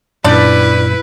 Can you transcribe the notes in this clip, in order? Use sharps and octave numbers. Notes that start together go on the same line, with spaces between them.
F#2 A#2 D4 E4 B4 D5 G6